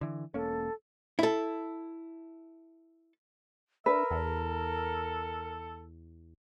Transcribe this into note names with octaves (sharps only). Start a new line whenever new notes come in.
D3 E3
E1 A#3 C#4 A4
E4 A4
D4 A#4 B4 E5
E2 A4